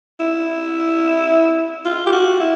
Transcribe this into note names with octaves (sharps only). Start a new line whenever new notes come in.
E4
F4
G4
F#4
E4